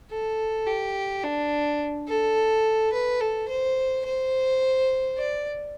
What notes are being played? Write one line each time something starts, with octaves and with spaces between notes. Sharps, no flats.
A4
G4
D4
A4
B4
A4
C5
C5
D5